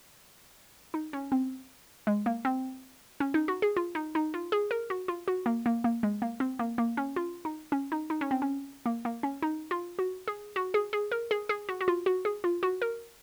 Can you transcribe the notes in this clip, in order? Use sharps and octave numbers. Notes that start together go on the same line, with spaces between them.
D#4
C#4
C4
G#3
A#3
C4
C#4
D#4
F#4
G#4
F4
D#4
D#4
F4
G#4
A#4
F#4
F4
F#4
A#3
A#3
A#3
G#3
A#3
C4
A#3
A#3
C#4
F4
D#4
C#4
D#4
D#4
C#4
C4
C#4
A#3
A#3
C#4
D#4
F4
F#4
G#4
F#4
G#4
G#4
A#4
G#4
G#4
F#4
F#4
F4
F#4
G#4
F4
F#4
A#4